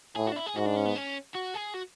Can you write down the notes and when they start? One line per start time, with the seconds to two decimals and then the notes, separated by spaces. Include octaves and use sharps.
0.16 A2 G#4
0.27 F#4
0.32 D4
0.37 E4
0.46 G#4
0.56 G#2 F#4
0.66 D4
0.76 C#4
0.86 B3
0.96 C#4
1.35 F#4
1.55 G#4
1.75 F#4